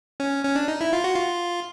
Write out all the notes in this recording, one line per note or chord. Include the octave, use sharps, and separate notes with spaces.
C#4
C#4
D4
D#4
E4
F4
F#4
F4